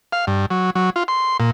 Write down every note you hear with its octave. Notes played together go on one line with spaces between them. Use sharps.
F5
G2
F#3
F#3
F4
C6
A#2